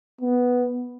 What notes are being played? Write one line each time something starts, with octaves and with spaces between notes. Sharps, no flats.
B3